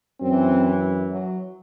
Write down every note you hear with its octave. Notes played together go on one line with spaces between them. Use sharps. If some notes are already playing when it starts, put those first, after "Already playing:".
F#2 E3 C4
F#3